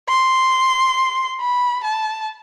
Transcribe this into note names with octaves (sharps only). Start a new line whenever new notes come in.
C6
B5
A5